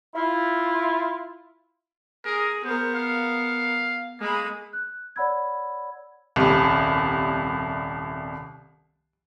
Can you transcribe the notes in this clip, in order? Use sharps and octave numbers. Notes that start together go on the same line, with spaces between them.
E4 F4
G#4 A#4
B3 A#4 C5
F5
G#3 A#3 B5
F#6
C#5 D5 F#5 B5 E6 G#6
D#1 C2